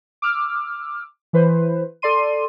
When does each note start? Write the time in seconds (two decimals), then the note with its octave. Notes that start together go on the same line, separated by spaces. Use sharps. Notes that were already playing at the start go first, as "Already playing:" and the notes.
0.22 D6 E6 F6
1.33 E3 B4 C5
2.02 A4 D5 C6 D#7